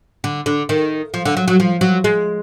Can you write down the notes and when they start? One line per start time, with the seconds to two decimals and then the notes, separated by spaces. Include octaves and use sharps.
0.24 D3
0.46 D3
0.69 D#3
1.14 F3
1.25 D3
1.37 F#3
1.48 F#3
1.60 F3
1.81 F#3
2.04 G#3